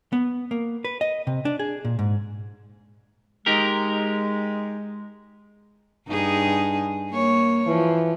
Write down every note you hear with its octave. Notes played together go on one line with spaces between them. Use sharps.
B3
A#3
B4
D#5
C3
D4
G#4
A#2
G#2
G#3 D#4 G4 A#4
G2 D#4 G#4
A#3 C#5
E3 F3